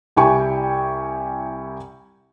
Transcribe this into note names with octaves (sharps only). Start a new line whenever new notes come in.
C2 E4 G4 G5 G#5 C#6